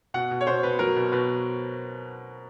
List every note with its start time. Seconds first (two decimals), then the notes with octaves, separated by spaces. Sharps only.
0.14 B2 F#5
0.31 B2
0.41 C#5
0.47 B2 C5
0.63 B2 B4
0.79 F#3 A#4
0.96 B2
1.12 B2 B4